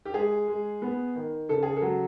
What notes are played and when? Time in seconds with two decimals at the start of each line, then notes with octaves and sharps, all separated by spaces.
0.05 G4
0.14 G#3 G#4
0.47 G#3
0.82 B3
1.15 D#3
1.49 C#3 A4
1.63 G#4
1.76 A4
1.82 F#3